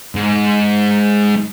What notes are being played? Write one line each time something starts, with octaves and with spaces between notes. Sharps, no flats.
G#2